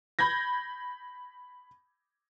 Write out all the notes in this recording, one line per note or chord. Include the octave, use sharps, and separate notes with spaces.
B5 G6 G#6 A#6